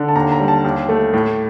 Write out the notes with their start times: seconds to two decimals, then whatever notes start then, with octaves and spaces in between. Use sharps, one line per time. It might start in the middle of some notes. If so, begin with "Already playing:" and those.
Already playing: D3
0.08 A5
0.15 D#2 A#5
0.32 A#5
0.40 G3
0.48 A5
0.64 D#2
0.89 A3
1.13 A2